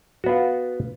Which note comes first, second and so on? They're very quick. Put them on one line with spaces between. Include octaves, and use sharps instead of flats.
F#4 B3 F4